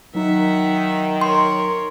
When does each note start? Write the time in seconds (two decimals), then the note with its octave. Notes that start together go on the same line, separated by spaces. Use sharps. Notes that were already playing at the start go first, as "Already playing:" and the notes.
0.15 D#3 F#3 D#4 E5 F#5
1.21 A#4 C#5 C6